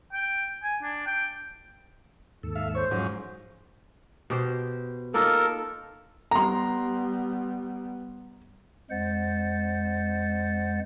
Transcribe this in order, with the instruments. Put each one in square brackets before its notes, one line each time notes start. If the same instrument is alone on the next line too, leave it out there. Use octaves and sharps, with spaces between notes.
[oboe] G5
G#5
D4
G5
[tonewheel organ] D#2 G#2 A4
[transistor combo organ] E5 F5
[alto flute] C5 [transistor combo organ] C#5
[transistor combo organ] G#2 F3 F#3 [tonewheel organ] C#4
[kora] B2 G4 C5
[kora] A#3 D#4 F4 [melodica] A4 A#4
[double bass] G3 B3 [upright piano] A#5 C6
[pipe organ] F2 G#3 C5 F#5 A6